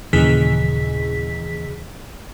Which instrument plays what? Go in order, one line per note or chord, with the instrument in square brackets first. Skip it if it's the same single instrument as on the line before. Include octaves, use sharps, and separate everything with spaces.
[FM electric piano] D#2 A#2 C#3 E3 G#4 B6